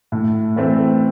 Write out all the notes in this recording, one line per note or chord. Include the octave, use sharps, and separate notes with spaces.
A2
E3 A3 C4